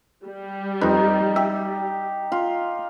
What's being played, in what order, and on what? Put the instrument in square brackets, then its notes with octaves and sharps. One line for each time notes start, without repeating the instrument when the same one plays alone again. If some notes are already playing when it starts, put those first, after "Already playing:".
[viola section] G3
[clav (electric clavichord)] F2 B4 [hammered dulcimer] D#4
[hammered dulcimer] G4 [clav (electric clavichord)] E5
[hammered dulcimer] F4